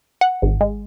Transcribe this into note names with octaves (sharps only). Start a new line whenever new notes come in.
F#5
G#1
G#3